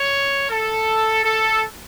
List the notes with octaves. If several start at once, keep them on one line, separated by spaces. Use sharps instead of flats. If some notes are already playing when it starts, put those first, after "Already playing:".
Already playing: C#5
A4
A4